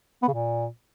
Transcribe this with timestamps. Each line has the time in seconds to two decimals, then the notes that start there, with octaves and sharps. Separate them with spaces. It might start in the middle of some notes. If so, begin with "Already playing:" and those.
0.23 B3
0.28 C#3
0.33 A#2